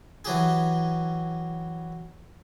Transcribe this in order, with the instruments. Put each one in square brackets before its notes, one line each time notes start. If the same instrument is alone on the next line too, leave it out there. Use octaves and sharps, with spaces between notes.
[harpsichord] E3 F#3 G4 G#4